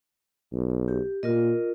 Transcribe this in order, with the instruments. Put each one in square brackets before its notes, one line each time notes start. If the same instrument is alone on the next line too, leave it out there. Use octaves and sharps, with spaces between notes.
[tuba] B1
[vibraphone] G4
[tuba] A#2 [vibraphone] F4 A#4 D#5